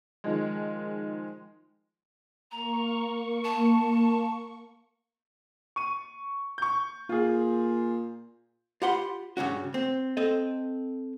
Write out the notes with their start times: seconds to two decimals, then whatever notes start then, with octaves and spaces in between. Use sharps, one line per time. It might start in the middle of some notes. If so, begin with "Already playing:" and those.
0.24 D#3 F3 G#3
2.51 A#3 A#5 C#6
3.44 A5
5.76 C#6 D#7
6.58 C#6 G6
7.09 A#2 F4 G#4
8.82 F4 G4 F#5 B5 C6
9.37 G2 C#3 C#4 F#4
9.74 C4
10.17 C4 A4 D#5